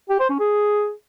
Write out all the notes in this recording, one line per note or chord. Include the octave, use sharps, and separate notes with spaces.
G4
C5
C#4
G#4